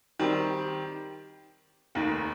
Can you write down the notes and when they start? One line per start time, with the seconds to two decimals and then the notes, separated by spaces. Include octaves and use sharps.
0.19 D#3 G3 C4 G4
1.95 F1 D#2 D#3